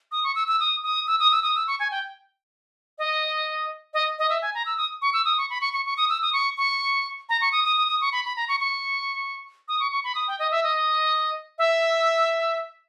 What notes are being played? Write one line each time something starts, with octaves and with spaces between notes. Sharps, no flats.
D#6
C#6
E6
E6
D#6
D#6
E6
D#6
E6
D#6
E6
C#6
G#5
G5
D#5
D#5
D#5
E5
G#5
A#5
E6
D#6
C#6
E6
D#6
C#6
B5
C#6
C#6
C#6
D#6
E6
D#6
C#6
C#6
A#5
C#6
D#6
D#6
D#6
D#6
C#6
B5
B5
A#5
C#6
C#6
D#6
C#6
C#6
B5
D#6
G5
D#5
E5
D#5
E5